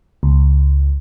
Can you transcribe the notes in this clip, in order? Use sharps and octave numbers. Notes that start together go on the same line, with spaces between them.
C#2